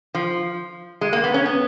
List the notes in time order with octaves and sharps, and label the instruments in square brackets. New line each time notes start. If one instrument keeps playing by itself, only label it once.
[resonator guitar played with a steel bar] F3
G#3
A#3
B3
C#4
B3